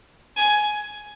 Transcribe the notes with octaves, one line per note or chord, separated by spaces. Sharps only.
G#5